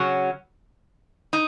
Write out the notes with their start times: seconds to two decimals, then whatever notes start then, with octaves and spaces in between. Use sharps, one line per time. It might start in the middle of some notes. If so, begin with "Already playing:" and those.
Already playing: C#3 F#3 C#4 F#4
1.33 D#4